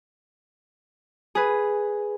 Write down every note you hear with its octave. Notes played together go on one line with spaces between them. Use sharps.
G#4 B4